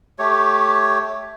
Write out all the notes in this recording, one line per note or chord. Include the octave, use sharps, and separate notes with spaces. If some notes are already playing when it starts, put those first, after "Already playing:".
A3 G4 C#5